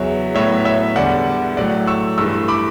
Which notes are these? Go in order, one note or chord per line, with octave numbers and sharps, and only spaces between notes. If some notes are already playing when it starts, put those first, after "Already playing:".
Already playing: E2 C#3 F#3 C#5 E5
A2 F#3 B3 C#5 E5
C#5 E5
E2 D3 G3 D5 F#5
A2 F#3 A3 D5 F#5
C#6 E6
G2 E3 A3 C#6 E6
B5 D6